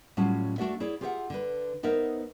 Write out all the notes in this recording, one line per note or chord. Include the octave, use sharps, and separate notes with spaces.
A2 F#3 G3 C#4 F4 A5
A3 D4 F#4 D5 E5
E4 G#4 C#5 D5
F4 G4 G#4 C5 E5 F#5
D3 B4
B3 D#4 A#4 C5 E5